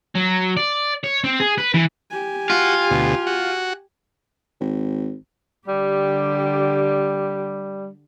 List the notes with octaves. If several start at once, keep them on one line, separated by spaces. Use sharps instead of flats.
F#3
D5
C#5
C4
G#4
B4
E3
G4 G#5
F4 F#4
D2 B2
F#4
G#1
D3 G3 G4